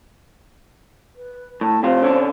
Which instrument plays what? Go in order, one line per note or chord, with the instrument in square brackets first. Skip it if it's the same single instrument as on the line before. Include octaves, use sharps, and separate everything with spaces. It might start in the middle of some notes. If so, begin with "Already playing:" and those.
[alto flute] B4
[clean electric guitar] A2 [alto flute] A5
[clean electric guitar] C3 F4 [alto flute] C5
[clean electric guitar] D3 C#4 D4